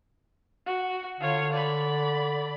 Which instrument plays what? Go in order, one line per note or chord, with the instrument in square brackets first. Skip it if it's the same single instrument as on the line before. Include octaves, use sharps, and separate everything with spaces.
[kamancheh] F#4
[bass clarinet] D3 [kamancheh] F4 C#5
[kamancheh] D5 B5